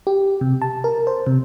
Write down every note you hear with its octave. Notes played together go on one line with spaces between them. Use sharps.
G4
C3
A5
A#4
C5
C3